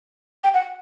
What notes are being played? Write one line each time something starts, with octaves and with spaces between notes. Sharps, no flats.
G5
F#5